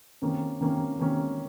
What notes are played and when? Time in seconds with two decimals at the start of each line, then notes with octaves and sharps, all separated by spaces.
0.22 C3 D#3 A#3 C#4
0.61 C3 D#3 A#3 C#4
0.99 C3 D#3 A#3 C#4